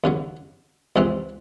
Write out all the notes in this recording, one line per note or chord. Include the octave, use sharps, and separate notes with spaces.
D#2 C#3 F#3
C#2 C3 E3 C4